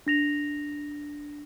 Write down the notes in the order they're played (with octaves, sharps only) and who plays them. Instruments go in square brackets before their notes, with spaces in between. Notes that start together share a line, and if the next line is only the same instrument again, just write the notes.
[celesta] D4 A#6 F7